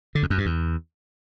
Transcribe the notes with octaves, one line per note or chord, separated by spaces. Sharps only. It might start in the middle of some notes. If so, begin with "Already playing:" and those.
D3
F2
F#2
G2
E2